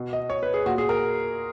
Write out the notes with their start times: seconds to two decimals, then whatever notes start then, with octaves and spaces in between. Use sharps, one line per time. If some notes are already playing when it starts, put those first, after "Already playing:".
Already playing: B2
0.13 D#5
0.30 C#5
0.43 B4
0.54 G#4
0.66 A#2 F#4
0.78 G#4
0.89 A#4